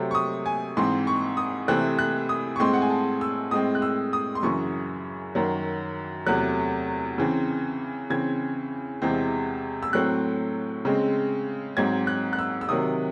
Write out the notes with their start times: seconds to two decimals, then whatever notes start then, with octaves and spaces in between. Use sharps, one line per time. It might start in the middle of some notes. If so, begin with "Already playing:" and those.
Already playing: C3 F#3 A3 C4
0.11 C#6
0.15 D#6
0.46 G#5
0.77 G#2 E3 C4 C6
1.07 C#6
1.37 D#6
1.68 C3 E3 A3 C4 F#6
1.99 F#6
2.29 D#6
2.56 C#6
2.59 A2 G#3 C4 C6
2.73 F#5
2.82 G#5
2.90 A5
3.21 E6
3.51 A2 G#3 C4 D#6
3.75 F#6
3.82 E6
4.13 D#6
4.35 C6
4.43 F#2 C#3 E3 C#6
5.35 F#2 D#3 F#3
6.26 E2 C3 F#3 A3 F#6
7.18 C#3 E3 C4
8.10 C#3 E3 C4 G#6
9.02 E2 C3 E3 G#3 C4
9.83 E6
9.93 A2 F#3 A3 C4 F#6
10.85 C#3 G#3 C4
11.77 G#2 F#3 C4 G#6
12.07 F#6
12.33 F#6
12.39 E6
12.61 E6
12.69 C3 D#3 F#3 D#6